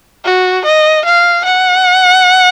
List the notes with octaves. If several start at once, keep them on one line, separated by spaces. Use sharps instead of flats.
F#4
D#5
F5
F#5